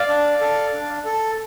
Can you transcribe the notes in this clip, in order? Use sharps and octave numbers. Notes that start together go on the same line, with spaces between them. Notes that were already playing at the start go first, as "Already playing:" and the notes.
Already playing: D5 F5
D4
A4
D4
A4